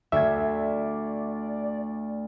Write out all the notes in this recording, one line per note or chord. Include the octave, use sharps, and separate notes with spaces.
D2 D5 E5 G#6